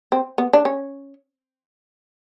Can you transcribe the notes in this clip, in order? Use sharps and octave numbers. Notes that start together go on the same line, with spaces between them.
C4
B3
D4
C#4